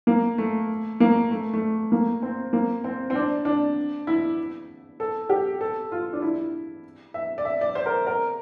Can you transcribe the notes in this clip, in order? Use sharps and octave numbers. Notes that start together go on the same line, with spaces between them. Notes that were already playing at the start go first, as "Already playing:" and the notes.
A#3
A3
A#3
A3
A3
A#3
C4
A#3
C4
C4
D4
D4
E4
A4
G4
A4
F4
D4
E4
E5
D5
E5
D5
C5
A#4
A#4